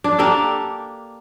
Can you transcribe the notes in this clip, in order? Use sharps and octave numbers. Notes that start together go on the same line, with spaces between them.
D4
A#3 D4 G4 A4